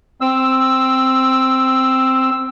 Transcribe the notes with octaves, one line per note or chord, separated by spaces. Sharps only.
C4 E6